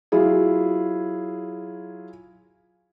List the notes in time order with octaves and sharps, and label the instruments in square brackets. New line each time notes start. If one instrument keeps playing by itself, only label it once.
[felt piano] F#3 E4 F4 G#4